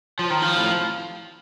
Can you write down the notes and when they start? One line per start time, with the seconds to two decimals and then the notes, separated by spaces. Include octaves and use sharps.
0.19 F3
0.30 D#3
0.42 F3
0.56 A2